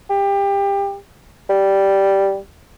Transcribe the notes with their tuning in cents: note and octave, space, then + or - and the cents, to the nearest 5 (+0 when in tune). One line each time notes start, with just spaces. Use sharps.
G4 +25
G3 -5